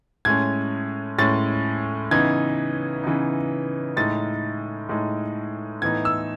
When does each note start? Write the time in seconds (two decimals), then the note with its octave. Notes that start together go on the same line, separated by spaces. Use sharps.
0.25 A2 G#3 C#4 G#6
1.18 A2 G#3 C#4 A6
2.11 C#3 E3 B3 D#4 G#6
3.04 C#3 E3 B3 D#4
3.97 A2 G#3 D#4 A6
4.89 A2 G#3 D#4
5.82 A2 E3 B3 D#4 G#6
6.05 E6